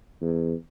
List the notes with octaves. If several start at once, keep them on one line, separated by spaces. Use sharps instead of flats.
E2